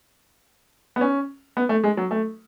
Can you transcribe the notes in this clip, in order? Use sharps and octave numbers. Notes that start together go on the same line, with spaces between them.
B3
C#4
B3
A3
G#3
F#3
A3